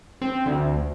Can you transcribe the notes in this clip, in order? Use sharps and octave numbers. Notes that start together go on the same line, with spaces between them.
C4
D2